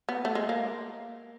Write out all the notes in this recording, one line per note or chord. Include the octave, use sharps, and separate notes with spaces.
B3
A3
G#3
A#3